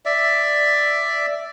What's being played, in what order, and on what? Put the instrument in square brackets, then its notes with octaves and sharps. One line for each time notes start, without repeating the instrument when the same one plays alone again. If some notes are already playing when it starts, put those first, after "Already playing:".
[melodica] D5 E5